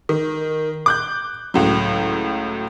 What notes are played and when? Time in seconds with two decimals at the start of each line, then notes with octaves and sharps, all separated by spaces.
0.09 D#3
0.86 D6 F#6 G6
1.54 C#2 A2 F#3